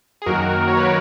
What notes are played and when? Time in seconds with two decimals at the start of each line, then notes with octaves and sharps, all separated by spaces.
0.22 G#4
0.26 F#2 D#3 A#3 F#4 A#4
0.68 C#5
0.77 B4
0.84 A#4